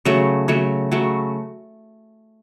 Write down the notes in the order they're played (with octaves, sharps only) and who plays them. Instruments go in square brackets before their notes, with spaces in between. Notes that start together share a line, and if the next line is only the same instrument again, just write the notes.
[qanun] C#3 F#3 A3
C#3 F#3 A3
C#3 F#3 A3